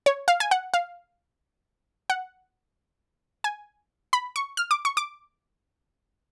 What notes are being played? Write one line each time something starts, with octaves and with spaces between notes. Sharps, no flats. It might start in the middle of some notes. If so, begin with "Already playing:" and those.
C#5
F5
G#5
F#5
F5
F#5
G#5
B5
C#6
F6
D6
C#6
D6